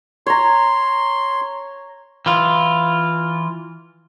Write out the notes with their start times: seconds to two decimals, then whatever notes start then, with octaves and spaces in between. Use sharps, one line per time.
0.27 C#5 A#5 C6
2.26 E3 F4